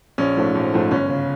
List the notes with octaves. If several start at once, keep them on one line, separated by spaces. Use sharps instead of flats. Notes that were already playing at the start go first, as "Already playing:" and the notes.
A#1 C#4
G#2 F3 A3
A#1
G#2 F3 A3
G1 C#4
C#3